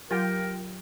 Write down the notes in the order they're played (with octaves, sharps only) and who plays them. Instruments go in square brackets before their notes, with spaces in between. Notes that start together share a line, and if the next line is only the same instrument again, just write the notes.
[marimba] F#3 [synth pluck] F4 G4 G5 [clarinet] A#4